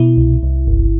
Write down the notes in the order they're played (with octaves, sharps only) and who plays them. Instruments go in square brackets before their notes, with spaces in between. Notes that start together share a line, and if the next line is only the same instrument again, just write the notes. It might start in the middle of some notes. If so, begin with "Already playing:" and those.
Already playing: [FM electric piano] B2 E4
C2
C2
G1